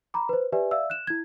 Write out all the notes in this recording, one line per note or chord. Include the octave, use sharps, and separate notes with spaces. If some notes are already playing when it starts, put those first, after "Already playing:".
A#5 B5 D6
B4 C5
G4 B4 D5 E5 G#5
D5 E5 F5 E6
F#6 E7
E4 G#6